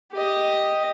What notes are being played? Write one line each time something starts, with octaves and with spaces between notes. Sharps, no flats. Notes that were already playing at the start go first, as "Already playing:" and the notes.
G4 D#5